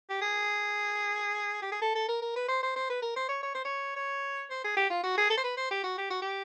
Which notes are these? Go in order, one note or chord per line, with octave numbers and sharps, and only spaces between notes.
G4
G#4
G4
G#4
A4
A4
A#4
A#4
B4
C5
C5
C5
B4
A#4
C5
C#5
C#5
C5
C#5
C#5
C5
G#4
G4
F4
F#4
G#4
A4
C5
B4
C5
G4
F#4
G4
F#4
G4